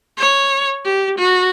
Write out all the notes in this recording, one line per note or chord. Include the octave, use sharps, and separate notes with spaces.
C#5
G4
F#4